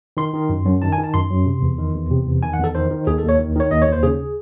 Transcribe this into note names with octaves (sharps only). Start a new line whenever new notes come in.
D#3 C6
D#3
F#2
F#2
D#3 A5
G#5
D#3
A5
F#2 C6
F#2
C3
E2
D#3
E2
C3
E2
D#3 G#5
F#5
E2 A4
D#3 C5
D#3
D#2 G#4
A4
D#2
C#5
D#3
D#3 C#5
D#2 D#5
C#5
D#2
C5
C#3 G#4